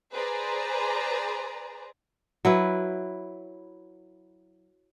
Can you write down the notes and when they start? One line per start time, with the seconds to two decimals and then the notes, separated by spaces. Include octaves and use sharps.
0.13 G#4 B4 C5 D5 A#5
2.45 F#3 E4 B4